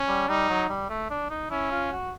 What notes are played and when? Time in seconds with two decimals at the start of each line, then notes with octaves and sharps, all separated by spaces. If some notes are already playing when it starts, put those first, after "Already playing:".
Already playing: C#4
0.08 G3
0.28 G3 D#4
0.49 F#3
0.69 G3
0.90 A3
1.10 D4
1.30 D#4
1.50 C#4 E4
1.71 F4
1.91 F#4